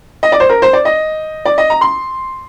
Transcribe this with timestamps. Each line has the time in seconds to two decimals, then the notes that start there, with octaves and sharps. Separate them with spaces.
0.23 D#5
0.32 D5
0.40 C5
0.49 A#4
0.62 C5
0.73 D5
0.85 D#5
1.45 D5
1.58 D#5
1.70 A#5
1.81 C6